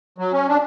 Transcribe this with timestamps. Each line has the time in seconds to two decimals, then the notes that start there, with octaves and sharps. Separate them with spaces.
0.18 F#3
0.33 C#4
0.48 D4